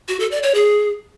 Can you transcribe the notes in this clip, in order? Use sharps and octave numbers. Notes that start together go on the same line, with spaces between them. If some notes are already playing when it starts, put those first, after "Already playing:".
F#4
A4
D5
C#5
G#4